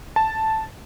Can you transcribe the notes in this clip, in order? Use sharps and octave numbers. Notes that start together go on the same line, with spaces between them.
A5